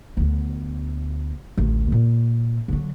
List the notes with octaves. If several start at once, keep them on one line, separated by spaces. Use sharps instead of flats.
D2 B3
A1 D2
A#2
D3 F#3